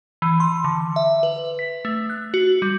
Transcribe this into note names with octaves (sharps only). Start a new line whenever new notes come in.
E3
C6
D3
E5
B4
B6
A3
F#6
F#4
G3